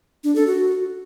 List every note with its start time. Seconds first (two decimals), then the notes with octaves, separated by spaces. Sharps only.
0.24 D4
0.35 A4
0.47 F#4